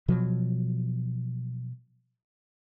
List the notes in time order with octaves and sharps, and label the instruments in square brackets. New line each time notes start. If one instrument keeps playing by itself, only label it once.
[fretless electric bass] B2 F3 F#3